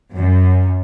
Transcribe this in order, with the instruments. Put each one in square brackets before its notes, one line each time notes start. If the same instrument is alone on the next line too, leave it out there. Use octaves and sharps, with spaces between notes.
[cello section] F#2